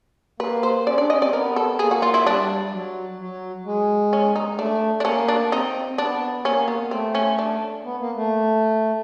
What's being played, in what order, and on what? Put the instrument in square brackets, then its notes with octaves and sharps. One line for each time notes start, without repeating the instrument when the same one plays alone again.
[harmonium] A#3 [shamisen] B4
[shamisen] C5
[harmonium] C#4 [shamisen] D5
[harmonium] D4 [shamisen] D5
[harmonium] C#4 [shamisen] D#5
[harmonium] C4 [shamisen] D5
[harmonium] B3 [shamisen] A#4
[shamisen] A4
[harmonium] A#3 [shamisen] G#4
[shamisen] F#4
F4
E4
[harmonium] G3 [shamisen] D4
[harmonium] F#3
F#3
G#3
[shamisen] C#4
D#4
[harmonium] A3 [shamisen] D4
[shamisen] D4
[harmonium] A#3 [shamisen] C#4
[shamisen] D4
[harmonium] C4 [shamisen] D#4
[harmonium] B3 [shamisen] D4
[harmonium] A#3 [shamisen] C#4
[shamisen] B3
[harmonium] A3 [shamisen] C4
[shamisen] C#4
D4
[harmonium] B3
A#3
A3